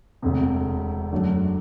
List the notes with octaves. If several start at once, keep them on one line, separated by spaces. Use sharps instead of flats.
E1 D2 C3
F#2 D3 F#3 A3 D4